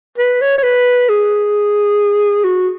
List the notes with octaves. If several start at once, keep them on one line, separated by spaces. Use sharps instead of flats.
B4
C#5
C#5
B4
G#4
F#4